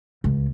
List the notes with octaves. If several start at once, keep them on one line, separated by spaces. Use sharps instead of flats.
C#2